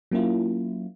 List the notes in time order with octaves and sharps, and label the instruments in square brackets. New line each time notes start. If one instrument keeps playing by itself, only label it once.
[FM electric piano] F#3 A#3 C#4 E4 F4